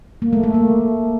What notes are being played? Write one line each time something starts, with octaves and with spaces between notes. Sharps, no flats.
A#3
A3
A3
A#3